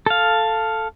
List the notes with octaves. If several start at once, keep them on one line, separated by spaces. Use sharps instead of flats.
A4 F5